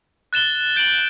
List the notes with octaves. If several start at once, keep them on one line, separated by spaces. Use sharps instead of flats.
F#6 A6 E7 G7
G6 D7 F#7